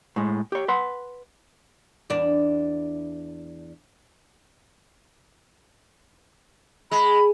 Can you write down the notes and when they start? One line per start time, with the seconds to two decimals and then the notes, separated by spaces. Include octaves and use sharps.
0.16 A2 G#3
0.52 G4 C#5
0.68 B4 F#5 C6
2.10 E2 D4
6.91 G#3 B5